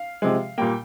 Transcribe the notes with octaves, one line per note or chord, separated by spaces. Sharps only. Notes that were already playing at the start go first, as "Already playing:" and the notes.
Already playing: F5
C3 F3 G#3
A#2 G3 A#3 G5